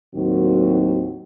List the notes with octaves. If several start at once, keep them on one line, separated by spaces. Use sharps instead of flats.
D#2 A2 D#3 F#3 C4 F#4